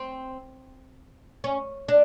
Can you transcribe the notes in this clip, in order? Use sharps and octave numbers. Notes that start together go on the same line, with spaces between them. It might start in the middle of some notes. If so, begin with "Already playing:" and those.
Already playing: C4
C#4
D4